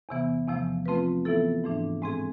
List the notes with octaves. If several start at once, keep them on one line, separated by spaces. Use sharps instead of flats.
E2 C3 E3 B3
E2 C3 F3 A3
F3 A3 C4 F4 B4
A2 E3 B3 E4 A4
G#2 E3 A3 D4
A2 G#3 C4 G#4